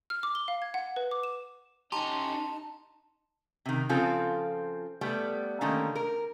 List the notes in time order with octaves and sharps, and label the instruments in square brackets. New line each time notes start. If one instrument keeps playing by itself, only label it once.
[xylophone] F6
D6
G7
F5
G#6
F#5
B4
D6
E7
[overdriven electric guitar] C#4 G4 [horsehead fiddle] D#4 [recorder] A5 [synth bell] A#5 C6
[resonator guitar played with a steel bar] C3 D#3
C#3 F3 C4 F4 A4
G3 A3 B3
D3 D#3 A3 A#3 C#4
A#4